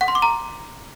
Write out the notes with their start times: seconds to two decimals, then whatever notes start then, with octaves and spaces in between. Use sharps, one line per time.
0.01 F#5
0.08 C6
0.15 D6
0.22 A#5